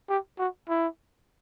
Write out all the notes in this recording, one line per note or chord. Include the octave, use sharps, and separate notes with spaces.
G4
F#4
E4